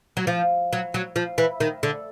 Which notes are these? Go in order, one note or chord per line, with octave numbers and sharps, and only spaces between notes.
F#3
F3
F#3
F#3
F3
E3
D#3
D3